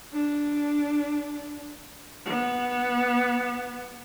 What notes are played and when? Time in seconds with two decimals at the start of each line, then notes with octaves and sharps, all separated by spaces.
0.13 D4
2.26 B3